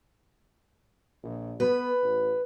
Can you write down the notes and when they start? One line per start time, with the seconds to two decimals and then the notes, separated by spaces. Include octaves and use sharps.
1.23 A#1
1.60 B3 B4
2.02 A1